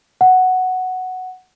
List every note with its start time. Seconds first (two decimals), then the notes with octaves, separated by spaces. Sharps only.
0.21 F#5